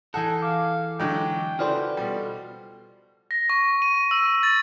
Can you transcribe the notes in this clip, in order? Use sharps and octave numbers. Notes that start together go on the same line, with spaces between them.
E3 D#4 G#4 A4 F#5 G#5
F5 D6
D3 F#3 G#3 G5
C#3 E3 F#4 A4 B4 C5 D5 F6
B2 F3 G3
A#6
C#6
D#7
E6
C#6
A6